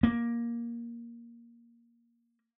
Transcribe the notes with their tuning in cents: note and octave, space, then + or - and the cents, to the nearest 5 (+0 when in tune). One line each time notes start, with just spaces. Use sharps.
A#3 +10